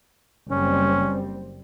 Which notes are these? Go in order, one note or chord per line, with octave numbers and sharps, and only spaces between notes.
F#1 G3 C4 C#4